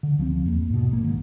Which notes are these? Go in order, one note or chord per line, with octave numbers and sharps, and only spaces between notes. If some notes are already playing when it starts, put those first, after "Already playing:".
D3
D2 F3 F#3 C4
E2 A#3
G#2 B2
A#1 A#3
G#2 D#3